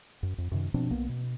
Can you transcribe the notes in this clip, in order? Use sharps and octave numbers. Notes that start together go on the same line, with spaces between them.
F#2
F2
F#2 C3 D#3
B2 F3 C4 D4
B1 A#3 B3
B2